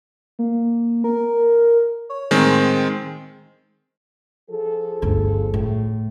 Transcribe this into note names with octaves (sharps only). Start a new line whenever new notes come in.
A#3
A#4
C#5
A2 D#3 G#3 C4
F3 G#4 A4
G1 D2
A2